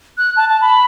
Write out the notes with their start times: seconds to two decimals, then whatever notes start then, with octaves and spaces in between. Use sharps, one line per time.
0.18 F#6
0.37 A5
0.49 A5
0.61 B5